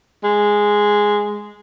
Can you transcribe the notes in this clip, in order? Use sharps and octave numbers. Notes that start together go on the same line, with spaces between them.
G#3